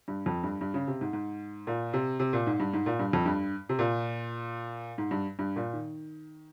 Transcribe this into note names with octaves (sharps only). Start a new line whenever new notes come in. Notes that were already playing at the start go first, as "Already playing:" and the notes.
G2
F2
G2
G2
C#3
C3
G#2
G#2
A#2
C3
C3
A#2
G#2
G2
G#2
A#2
G2
F2
G2
C3
A#2
G#2
G2
G2
A#2
D#3